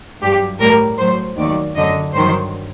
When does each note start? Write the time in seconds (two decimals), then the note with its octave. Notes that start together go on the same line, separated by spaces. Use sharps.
0.21 G2 F#3 G4
0.60 A2 G3 A#4
0.99 A2 F#3 C5
1.37 D#2 D#3 F#3 D5
1.75 F#2 D3 F#3 D#5
2.14 G2 D#3 F#3 C5